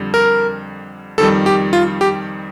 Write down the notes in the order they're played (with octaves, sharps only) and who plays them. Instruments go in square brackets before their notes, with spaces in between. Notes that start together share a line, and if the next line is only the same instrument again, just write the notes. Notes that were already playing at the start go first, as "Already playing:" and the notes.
Already playing: [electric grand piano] F2 D3 G3
A#4
F2 D#3 G3 A4
G4
F4
G4